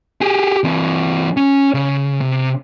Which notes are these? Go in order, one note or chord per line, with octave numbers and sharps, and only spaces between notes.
G4 G#4
E3 C4
C#4
C#3
C3